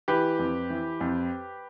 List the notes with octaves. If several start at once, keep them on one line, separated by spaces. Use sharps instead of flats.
E3 G4 B4
F2
E3
F2